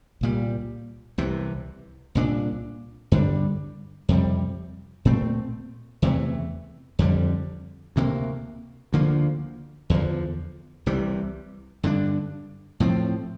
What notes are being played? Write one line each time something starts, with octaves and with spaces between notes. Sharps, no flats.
C2 A#2 G3
C2 C3 E3
C2 A#2 G3 D4
G2 D3 G3 D4
F2 C3 G3
A#2 A3 C4
E2 C3 E3 A3
F2 D3 G3
D2 C3 G3 A#3
D2 D3 F3 A#3
E2 D3 F3
C2 C3 E3 G3
G2 D3 A3 D4
A2 F3 C4